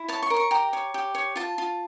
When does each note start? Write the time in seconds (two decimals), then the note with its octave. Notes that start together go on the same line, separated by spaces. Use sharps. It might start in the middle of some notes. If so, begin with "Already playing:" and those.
Already playing: E4
0.08 C#5 A5
0.22 C#6
0.30 A#4
0.36 C#6
0.51 G4 A#5
0.73 C#5
0.94 G4
1.15 C#5
1.36 F4 A5
1.58 F4